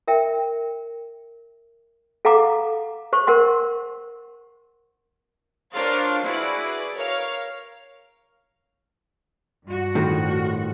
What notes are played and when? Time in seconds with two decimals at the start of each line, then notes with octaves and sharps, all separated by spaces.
0.08 A#4 E5 G5
2.25 A4 F5 F#5 A#5 D6
3.13 C5 C#6
3.27 A#4 C5 F#5 C6
5.73 D4 F4 A#4 C5 C#5 F5
6.25 E4 F#4 G#4 B4 D5
6.96 A#4 C#5 F5 F6
9.64 G2 F#4
9.95 A2 D#3 F3